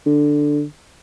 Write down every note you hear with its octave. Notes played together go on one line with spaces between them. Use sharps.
D3